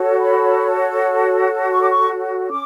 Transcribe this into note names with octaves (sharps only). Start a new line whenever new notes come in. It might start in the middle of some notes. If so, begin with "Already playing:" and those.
Already playing: F#4 A4 C#5
B5
C#6
D6
C#6
C#4 D6